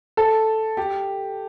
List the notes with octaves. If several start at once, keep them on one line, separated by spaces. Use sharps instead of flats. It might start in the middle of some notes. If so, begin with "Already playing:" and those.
A4
G4